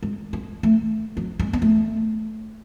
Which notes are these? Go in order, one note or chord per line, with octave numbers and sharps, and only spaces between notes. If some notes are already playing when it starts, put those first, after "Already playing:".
G#3
G#3
A3
F#3
G#3
B3
A3